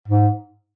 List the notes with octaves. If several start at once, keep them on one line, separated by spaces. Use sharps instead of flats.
G#2